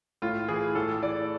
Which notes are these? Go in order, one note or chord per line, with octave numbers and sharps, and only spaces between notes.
A2 F4
E3 G#4
A2 A4
E3 D5